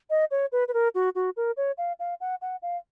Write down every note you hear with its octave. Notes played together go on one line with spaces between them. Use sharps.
D#5
C#5
B4
B4
A#4
F#4
F#4
A#4
C#5
F5
F5
F#5
F#5
F5